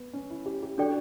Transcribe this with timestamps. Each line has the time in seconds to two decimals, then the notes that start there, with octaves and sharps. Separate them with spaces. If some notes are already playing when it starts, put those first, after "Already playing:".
Already playing: B3
0.13 C#4
0.30 E4
0.46 G4
0.62 G4
0.78 D4 F#4 A4 D5 G5